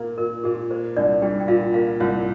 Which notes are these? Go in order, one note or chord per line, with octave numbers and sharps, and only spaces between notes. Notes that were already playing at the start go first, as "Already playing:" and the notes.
Already playing: A#2 A#3
A#2 A#4
A#2 G4
A#3 C5
C2 D4 D5
G3 G4 G5
G5
A#2 F4 F5
A#3 F4 F5
C2 F4 F5